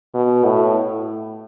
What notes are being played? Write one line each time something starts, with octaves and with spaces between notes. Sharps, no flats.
B2
A2